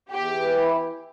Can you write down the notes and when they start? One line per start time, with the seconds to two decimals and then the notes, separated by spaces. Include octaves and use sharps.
0.11 E2 G4
0.34 E3
0.57 E4